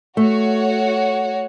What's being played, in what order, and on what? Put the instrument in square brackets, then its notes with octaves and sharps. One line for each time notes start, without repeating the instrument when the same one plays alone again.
[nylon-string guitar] A3 [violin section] F#4 C#5